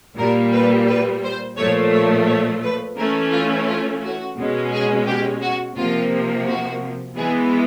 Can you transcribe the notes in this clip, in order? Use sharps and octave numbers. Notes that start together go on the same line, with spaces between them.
A#2 G3 A#3 A#4
B4
B4
C5
A#2 F3 A3 C#5
C#5
C#5
B4
E3 A3 C#4 A#4
F4
F4
F#4
B2 G#3 C#4
G#4
G4
F#4
C3 F3 A#3 F4
F#4
E3 G#3 B3 G#4